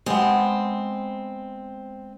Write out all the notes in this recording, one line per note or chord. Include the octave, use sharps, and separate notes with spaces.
G#3 B3 C4